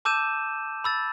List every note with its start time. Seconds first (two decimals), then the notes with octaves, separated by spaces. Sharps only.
0.05 A5 D6 E6 G6 D#7 E7
0.84 B5 E6 A6